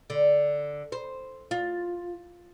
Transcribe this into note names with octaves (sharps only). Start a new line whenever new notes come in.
D3
C5
F4